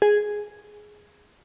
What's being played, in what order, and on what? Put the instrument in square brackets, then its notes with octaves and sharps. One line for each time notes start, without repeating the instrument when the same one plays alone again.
[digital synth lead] G#4